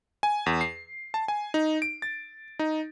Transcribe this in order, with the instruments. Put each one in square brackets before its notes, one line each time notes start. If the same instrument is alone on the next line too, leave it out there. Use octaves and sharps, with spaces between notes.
[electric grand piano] G#5
E2
C7
A5
G#5
D#4
D7
A6
D#4